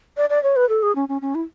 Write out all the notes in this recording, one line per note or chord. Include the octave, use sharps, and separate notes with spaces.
D5
D5
C#5
B4
A4
G#4
C#4
C#4
C#4
E4